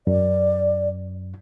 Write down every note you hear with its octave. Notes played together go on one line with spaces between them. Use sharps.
F#2 D5